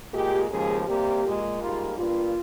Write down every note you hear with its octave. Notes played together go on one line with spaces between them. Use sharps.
A#2 G#3 G4
D#2 C#3 F3 G#3 G#4
C3 G3 A#3 G4
A#2 G#3
G#2 G3 A#3 F4
G2 G3 A#3 F4